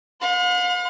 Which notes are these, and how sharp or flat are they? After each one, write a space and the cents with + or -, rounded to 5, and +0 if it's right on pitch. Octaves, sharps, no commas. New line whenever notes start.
F5 +45 C6 -40